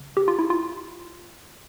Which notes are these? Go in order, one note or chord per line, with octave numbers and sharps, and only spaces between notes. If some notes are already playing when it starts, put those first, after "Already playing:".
Already playing: C#3
G4
F4
E4
F4